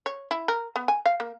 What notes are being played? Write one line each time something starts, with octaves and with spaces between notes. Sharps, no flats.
C#5
E4
A#4
B3
G#5
F5
A#3